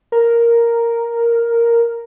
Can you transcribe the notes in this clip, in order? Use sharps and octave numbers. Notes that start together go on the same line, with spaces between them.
A#4